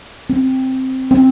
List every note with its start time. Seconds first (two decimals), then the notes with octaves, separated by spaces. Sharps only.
0.30 C4
1.11 C4